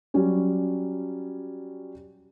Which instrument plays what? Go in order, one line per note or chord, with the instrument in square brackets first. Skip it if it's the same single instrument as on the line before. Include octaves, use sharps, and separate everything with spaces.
[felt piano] F#3 G3 C#4